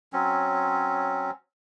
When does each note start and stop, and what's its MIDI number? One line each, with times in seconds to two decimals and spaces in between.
0.13 1.31 54
0.13 1.31 60
0.13 1.31 61